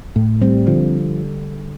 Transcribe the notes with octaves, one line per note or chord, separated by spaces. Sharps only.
A2
G3 C4
D3 F3